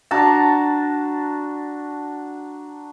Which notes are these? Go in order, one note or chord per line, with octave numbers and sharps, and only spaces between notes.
D4 F#4 A5 A#5